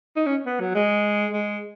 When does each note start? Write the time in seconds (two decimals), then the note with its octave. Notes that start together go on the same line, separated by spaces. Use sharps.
0.16 D#4
0.26 C#4
0.46 B3
0.60 F#3
0.75 G#3
1.33 G#3